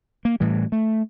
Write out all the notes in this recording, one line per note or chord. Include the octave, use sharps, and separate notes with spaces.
A#3
A2 E3 G3
A3